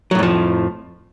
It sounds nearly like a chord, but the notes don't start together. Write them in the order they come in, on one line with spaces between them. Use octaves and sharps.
F#3 A2 F2 F3